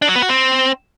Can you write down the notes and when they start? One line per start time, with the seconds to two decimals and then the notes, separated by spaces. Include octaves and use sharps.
0.02 D4
0.09 F#3
0.16 B3
0.22 F#4
0.29 C4